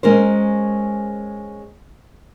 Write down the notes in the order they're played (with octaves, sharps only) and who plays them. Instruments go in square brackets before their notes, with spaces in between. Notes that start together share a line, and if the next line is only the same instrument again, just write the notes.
[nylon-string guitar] G#3 C#4 A#4 C5